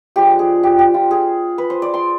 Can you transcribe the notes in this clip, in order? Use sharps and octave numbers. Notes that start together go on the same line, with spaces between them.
F3 G#3 D4 G4
G#4
G4
G4
F4
G#4
B4
C5
D5
C6